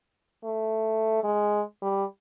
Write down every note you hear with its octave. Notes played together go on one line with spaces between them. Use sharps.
A3
G#3
G3